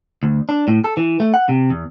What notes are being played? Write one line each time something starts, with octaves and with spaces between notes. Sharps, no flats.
D2
D4
A2
A4
E3
A3
F#5
C3
E2